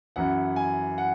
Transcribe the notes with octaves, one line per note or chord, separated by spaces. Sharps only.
F#2 E3 F#5
G#5
F#5